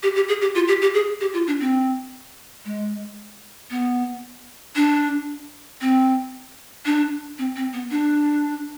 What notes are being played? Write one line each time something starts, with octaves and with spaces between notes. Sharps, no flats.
G4
G4
G#4
G4
F4
G4
G4
G#4
G4
F4
D4
C4
G#3
B3
D4
C4
D4
C4
C4
B3
D4